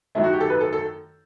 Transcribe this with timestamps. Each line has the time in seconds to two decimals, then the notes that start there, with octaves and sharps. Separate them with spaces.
0.15 F#2 D#3 F#3 A3 E4
0.24 F#4
0.33 G4
0.40 A4
0.50 B4
0.61 A4
0.73 A4